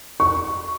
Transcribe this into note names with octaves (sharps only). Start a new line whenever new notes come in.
C#6